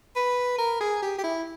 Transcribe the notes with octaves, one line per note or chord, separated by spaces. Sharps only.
B4
A#4
G#4
G4
G4
E4